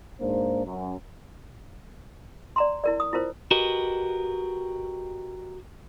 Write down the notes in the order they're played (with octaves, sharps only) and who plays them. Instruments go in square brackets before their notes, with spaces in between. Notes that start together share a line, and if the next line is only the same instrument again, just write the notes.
[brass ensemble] G#2 A#3 D4 C5
F#2
[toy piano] D5 A#5 C6
E4 A#4 D5
D#6
E4 F4 A#4 C5
[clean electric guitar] F#4 G4 A#4 B4 D#5